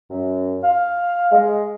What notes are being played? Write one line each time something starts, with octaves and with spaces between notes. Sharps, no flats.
F#2
F5
G#3